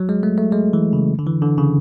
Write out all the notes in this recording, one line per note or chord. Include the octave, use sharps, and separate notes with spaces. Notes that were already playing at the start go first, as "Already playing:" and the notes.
Already playing: F#3
G#3
A3
A3
G#3
E3
C#3
D3
E3
D3
C#3